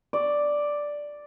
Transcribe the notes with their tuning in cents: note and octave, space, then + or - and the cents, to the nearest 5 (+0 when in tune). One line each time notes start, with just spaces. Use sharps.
D5 +0